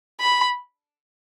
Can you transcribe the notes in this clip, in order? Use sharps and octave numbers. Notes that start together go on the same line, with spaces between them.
B5